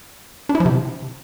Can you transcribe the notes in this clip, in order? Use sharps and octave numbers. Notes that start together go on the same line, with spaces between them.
D4
E4
F3
C3